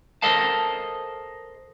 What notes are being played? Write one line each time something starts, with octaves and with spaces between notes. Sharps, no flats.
A4 A#4 C5 D#5 F5 A5